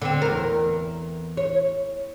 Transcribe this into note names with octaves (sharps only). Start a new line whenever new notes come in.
D3 C4
E2 A#4
C#5